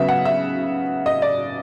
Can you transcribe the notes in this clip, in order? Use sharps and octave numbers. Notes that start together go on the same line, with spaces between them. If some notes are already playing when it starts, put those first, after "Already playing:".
Already playing: C#3 F#3 B3 E5
F#5
E5
D#5
D5